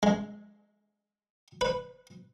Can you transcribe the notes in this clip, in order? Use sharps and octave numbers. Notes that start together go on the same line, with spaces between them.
G#3
B4